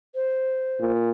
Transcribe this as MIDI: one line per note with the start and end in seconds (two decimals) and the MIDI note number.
0.14 0.91 72
0.80 1.11 46